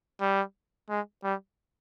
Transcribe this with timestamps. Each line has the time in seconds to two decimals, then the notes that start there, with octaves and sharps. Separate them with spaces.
0.21 G3
0.90 G#3
1.24 G3